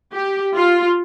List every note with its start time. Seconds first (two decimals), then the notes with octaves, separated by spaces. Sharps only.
0.13 G4
0.56 F4